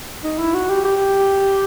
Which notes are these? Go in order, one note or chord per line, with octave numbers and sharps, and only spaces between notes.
D#4
E4
F#4
G4
G4